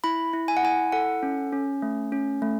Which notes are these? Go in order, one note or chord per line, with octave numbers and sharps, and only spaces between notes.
E4 B5
E4
G#5
F#5
E4 G#5
A4 F#5
C#4
C#4
A3
C#4
A3